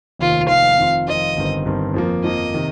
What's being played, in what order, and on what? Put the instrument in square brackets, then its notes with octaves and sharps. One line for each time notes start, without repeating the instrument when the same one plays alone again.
[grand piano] F1 D#2 D#3 C4 [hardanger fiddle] F4
[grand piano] F1 D#2 D#3 C4 [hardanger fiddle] F5
[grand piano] F2 D#3 C4 F4
[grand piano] F2 D#3 C4 F4 [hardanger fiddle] D#5
[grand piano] G1 G2 D#3 C4
G1 G2 D#3 C4
F2 F3 A#3
[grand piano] F2 F3 A#3 [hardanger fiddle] D#5
[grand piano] C3 D#3